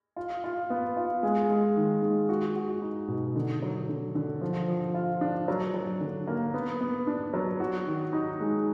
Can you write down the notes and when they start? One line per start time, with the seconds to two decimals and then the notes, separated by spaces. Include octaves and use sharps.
0.16 F4
0.44 F4
0.70 B3
0.97 F4
1.23 G#3
1.50 G#3
1.77 D#3
2.02 G#3
2.29 F#4
2.56 F#4
2.82 D#4
3.08 B2
3.36 D3
3.62 F#3
3.89 D3
4.15 D3
4.41 F3
4.68 F3
4.94 F4
5.21 D4
5.48 F#3
5.74 F#3
6.00 D3
6.27 A#3
6.54 B3
6.81 B3
7.07 D4
7.34 F#3
7.60 F#4
7.87 D#3
8.13 D#4
8.40 G#3